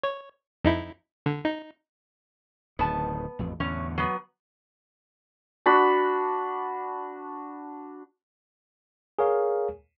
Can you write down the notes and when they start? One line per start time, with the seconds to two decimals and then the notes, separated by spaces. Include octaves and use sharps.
0.04 C#5
0.64 F2 D#4 E4
1.26 D3
1.45 D#4
2.79 D1 D#3 B3 A5
3.39 A1 F2
3.60 E2 A2 D3 C#4
3.98 F#3 B3
5.66 D4 F#4 B5
9.19 G#4 A#4 C#5 F5